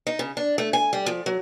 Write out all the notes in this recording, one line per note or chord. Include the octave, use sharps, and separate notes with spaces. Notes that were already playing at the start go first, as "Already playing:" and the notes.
D#4
C#3
D4
A3
G#5
G3
F3
F#3